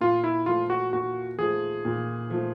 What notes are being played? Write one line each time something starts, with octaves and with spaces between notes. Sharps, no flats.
A#2 F4
E4
F3 A3 F4
F#4
A#2 F#4
F3 A3 G#4
A#2
F3 A3